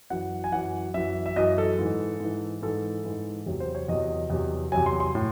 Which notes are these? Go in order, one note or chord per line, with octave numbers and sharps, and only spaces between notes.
F#2 E3 F#5
G#5
F#2 E3 F#5
F#2 E3 E5
E5
F#2 E3 D#5
A4
G#2 E3
G#2 E3
G#2 E3 A4
G#2 E3
E2 C3 F#3
C5
C#5
E2 C3 F#3 D#5
E2 C3 F#3
E2 C3 F#3 G#5
C6
C6
A2